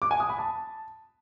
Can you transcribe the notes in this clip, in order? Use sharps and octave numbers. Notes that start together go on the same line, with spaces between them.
D6
G#5
D#6
B5
A5